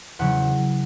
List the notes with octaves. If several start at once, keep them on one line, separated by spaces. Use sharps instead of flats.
E2 C#3 F#3 F#5